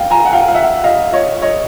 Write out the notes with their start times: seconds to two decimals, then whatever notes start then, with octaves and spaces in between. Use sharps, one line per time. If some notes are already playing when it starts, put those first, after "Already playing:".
Already playing: F5 G5
0.11 G#5 A#5
0.25 F#5
0.33 F5 G5
0.48 F5
0.54 E5 F#5
0.84 D#5 F5
1.13 C#5 D#5
1.42 C#5 D#5